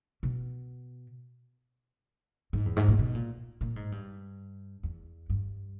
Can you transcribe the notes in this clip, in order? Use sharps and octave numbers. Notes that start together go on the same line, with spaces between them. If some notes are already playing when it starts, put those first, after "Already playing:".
B2
G#2
E2
G#2
A#2
B2
A#2
A#2
G#2
G2
E2
G2